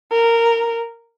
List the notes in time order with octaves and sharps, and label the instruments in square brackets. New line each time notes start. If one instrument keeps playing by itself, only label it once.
[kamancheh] A#4